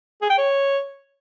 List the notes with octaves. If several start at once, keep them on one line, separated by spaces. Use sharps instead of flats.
G#4
G5
C#5